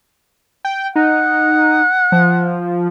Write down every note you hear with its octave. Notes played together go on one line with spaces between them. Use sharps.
G5
D#4 F#5
F3